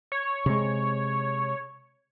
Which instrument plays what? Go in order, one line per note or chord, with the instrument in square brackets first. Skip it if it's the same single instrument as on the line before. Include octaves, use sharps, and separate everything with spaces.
[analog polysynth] C#5
[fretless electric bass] C3 G#3